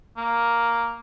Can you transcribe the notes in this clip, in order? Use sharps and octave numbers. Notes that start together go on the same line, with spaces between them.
A#3